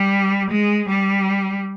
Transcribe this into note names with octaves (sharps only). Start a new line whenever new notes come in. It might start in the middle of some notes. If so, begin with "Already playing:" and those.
Already playing: G3
G#3
G3